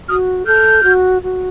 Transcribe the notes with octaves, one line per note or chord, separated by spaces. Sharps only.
F#4 D#6 F6
A4 F6 G6
F#4
F#4